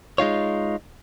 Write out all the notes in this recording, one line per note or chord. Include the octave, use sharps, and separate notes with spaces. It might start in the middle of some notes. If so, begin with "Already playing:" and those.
G#3 D#4 F4 C#5